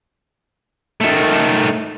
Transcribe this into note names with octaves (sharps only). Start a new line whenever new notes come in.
D#3 A3